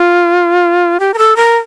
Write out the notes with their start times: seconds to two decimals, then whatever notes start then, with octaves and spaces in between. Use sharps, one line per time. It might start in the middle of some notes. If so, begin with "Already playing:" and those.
Already playing: F4
1.00 G4
1.14 A#4
1.18 A4
1.36 A#4